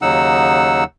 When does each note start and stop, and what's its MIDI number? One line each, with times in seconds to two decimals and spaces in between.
0.02 0.84 39
0.02 0.84 49
0.02 0.84 54
0.02 0.84 63
0.02 0.84 78
0.02 0.84 88